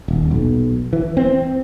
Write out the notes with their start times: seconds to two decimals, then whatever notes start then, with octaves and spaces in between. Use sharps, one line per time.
0.08 D#1
0.31 B1
0.93 E3
1.17 C4